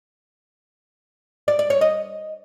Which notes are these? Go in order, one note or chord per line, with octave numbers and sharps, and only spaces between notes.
D5
D5
C#5
D#5